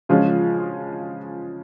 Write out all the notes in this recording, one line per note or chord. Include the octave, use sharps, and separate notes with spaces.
C#3 F3 G#3 C#4 F4